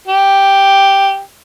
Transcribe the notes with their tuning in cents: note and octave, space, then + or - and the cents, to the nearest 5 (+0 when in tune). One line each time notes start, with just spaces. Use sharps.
G4 +0